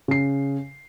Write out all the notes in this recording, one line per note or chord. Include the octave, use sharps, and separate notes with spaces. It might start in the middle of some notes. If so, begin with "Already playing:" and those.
C#3 C7